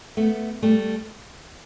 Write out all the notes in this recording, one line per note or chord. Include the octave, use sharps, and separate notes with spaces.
A3 B3
G3 A3